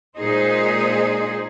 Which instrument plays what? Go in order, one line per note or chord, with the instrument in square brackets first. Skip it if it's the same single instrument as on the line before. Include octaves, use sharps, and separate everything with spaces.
[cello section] A#2 G#3 D#4 G#4 C5